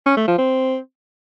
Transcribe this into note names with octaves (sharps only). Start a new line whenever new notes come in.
C#4
A3
F3
C4